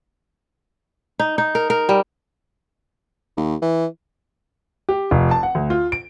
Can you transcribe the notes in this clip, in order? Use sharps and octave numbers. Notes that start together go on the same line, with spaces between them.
D#4
D#4
A#4
A#4
G3
D#2
E3
G4
F1
A5
F#5
D2
F4
D7